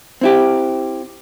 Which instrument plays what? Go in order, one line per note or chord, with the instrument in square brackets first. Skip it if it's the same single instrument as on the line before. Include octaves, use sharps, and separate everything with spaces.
[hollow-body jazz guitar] C4 E4 G4